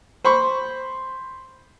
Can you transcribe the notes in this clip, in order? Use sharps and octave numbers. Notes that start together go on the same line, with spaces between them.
C5 B5 C#6